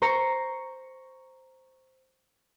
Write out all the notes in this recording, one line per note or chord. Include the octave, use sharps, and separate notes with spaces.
C5 A#5 C#6